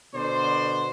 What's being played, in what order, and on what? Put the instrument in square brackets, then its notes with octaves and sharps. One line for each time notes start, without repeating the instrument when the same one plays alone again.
[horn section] B2 D3 C5 D5 C6